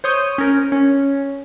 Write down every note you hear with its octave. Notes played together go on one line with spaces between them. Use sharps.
C5 C#5 D#6 G6
C#4 A#4
C#4